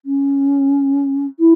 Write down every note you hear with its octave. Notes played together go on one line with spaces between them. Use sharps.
C#4
E4